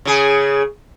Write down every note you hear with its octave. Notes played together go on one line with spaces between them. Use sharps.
C#3 G#4